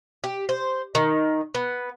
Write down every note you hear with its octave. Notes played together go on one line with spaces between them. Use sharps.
G4
C5
D#3
B3